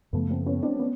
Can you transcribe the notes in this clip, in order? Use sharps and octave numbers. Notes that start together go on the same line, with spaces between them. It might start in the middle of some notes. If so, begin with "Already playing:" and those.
F#2 C#3 F3 A3 B3
A#3 C4
B3 C#4
C4 D4
B3 C#4